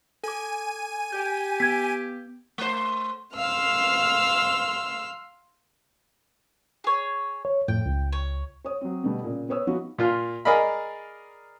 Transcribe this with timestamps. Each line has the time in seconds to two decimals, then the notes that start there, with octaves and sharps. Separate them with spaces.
0.24 A4 G#5 D6 D#7
1.12 G4 G6
1.60 B3 G#6 B6
2.58 A3 C5
3.34 F5 C6 E6 F6
6.84 G#4 C#5
7.45 C#5
7.68 F2 A2 G5
7.86 C#2
8.12 C#5
8.65 C#5 D#6
8.81 F#3 C4
9.03 B2 D3 G3 A3 B3
9.24 A#2 C#3
9.48 B3 B4 C#5 D#6 E6
9.67 F3 B3 D#4 F4 F#4
9.99 A#2 F4 F6
10.45 G#4 A#4 D5 D#5 F5 B5